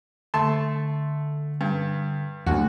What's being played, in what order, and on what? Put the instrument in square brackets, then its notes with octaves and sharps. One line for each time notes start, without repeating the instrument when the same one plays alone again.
[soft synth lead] D3 [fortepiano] A3 A5 C6
[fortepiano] G2
[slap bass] D2 [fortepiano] F#4